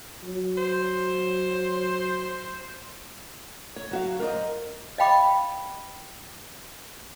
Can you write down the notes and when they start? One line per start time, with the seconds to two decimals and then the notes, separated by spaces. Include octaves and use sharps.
0.23 F#3
0.58 C5
3.76 C#5
3.91 F#3 F#4 F5
4.19 A#4 C5 D5 D#5
4.98 D#5 F5 G5 B5 D6